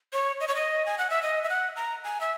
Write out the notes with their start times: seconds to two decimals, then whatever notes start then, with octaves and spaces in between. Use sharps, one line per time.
0.13 C#5
0.41 D#5
0.48 C#5
0.55 D#5
0.86 G#5
0.98 F#5
1.10 E5
1.23 D#5
1.44 E5
1.49 F#5
1.76 A#5
2.04 G#5
2.21 E5